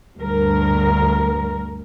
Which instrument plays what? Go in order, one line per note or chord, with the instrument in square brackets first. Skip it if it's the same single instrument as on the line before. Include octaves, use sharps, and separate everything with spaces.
[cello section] D2 G2 A#4